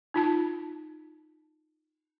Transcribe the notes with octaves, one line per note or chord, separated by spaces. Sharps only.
D#4 F4 A5